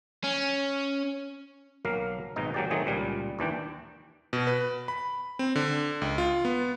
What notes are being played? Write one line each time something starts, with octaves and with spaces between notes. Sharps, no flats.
C#4
B1 F#3 A#3 A#4 F5
G#1 G#2 B2 D#4 D#5
F#3 A#3 G4 G#4 D5
D#3 F#3 A3 C4 G#4
C#2 A#2 G3
D#2 E3 D4 G5
B2
B4
B5
C4
D3
C#2
F4
B3